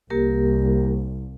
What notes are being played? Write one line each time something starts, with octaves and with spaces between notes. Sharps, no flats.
C2 A#3 G4 A#4